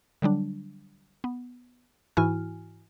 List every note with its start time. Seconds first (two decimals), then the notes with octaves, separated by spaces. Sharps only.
0.22 D3 F#3 G3 D4
1.24 B3
2.17 G#2 E3 E4 F#4 G#5 F6